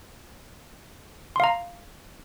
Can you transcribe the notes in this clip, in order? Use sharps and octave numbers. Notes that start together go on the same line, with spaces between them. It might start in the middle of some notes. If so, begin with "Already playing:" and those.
F5 A#5 C6